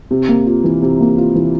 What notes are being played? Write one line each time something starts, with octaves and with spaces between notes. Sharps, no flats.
C3
A#3
F4
E3
C3
A#3
F4
E3